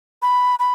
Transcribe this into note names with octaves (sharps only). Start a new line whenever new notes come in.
B5
B5